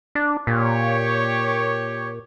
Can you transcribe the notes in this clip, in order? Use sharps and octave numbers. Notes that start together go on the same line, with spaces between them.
D4
A#2 G4 C#5